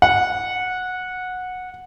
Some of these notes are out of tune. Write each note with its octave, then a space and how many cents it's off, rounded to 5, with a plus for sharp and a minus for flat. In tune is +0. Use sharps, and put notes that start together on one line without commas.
F#5 -15